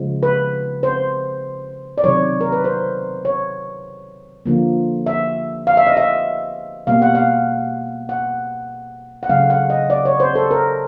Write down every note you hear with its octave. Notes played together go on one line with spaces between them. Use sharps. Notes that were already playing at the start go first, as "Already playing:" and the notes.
Already playing: C#3 F3 G#3
B4
C5
D5
C3 D#3 F#3 C#5
A#4
B4
C5
C#5
D3 F3 A#3
E5
F5
E5
D#5
E5
B2 G3 A#3 F5
F#5
F5
F#5
F#5
C#3 F#3 A3 F5
F#5
D#5
D5
C#5
C5
A4
A#4